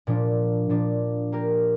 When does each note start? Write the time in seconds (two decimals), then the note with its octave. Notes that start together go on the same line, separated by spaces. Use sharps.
0.07 A#2 F3 D4
0.69 A#2 F3 D4
1.32 A#3 G4 A#4